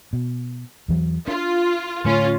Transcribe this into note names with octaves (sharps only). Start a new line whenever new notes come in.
B2
E2 E3 F#3
D4 F4
A2 D3 A3 C#4 F4